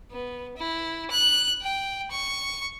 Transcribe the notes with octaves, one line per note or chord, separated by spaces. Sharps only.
B3
E4
F#6
G5
C#6